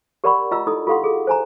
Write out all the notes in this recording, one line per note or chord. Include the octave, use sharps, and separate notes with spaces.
G4 A#4 D5 F#5 B5 C#6
F4 D#5 A#5 E6
D#4 E4 A4 D#6
F4 G4 A4 F5 F#5 C6
G#4 A4
C5 G#5 A#5